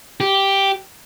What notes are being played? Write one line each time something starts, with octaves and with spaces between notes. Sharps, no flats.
G4